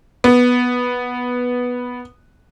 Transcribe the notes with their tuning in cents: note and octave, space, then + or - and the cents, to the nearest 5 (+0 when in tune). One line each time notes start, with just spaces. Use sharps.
B3 -5